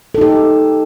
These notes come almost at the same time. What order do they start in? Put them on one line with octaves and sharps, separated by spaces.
A4 D#4 G4